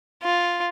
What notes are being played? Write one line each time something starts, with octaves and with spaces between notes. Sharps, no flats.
F4